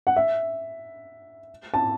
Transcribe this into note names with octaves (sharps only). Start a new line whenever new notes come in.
F#5
E5
A5